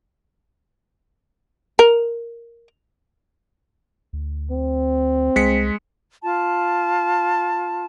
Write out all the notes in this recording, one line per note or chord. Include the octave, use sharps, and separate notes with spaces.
A#4
D2
C4
C2 G#3 B6 C#7
F4 A5